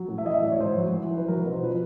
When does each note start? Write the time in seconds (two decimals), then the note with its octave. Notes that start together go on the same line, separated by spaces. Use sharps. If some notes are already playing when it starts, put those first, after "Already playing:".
Already playing: F#3
0.08 A2
0.18 E5
0.25 E3 D#5
0.33 E5
0.42 A2 D5
0.52 C#5
0.60 G#2 C5
0.78 F#3
0.94 E3
1.11 E3
1.18 B4
1.28 F#3 A#4
1.40 B4
1.46 B2
1.51 C5
1.63 F3 B4